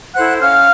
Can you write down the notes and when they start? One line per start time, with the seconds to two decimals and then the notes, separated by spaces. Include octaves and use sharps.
0.15 E4 A4 C5 F#5 F#6
0.41 C#4 F5 F6